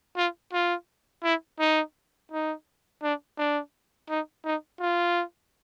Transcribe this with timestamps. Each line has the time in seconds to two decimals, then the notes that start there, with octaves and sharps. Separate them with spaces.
0.17 F4
0.53 F4
1.23 E4
1.59 D#4
2.32 D#4
3.03 D4
3.38 D4
4.09 D#4
4.45 D#4
4.80 F4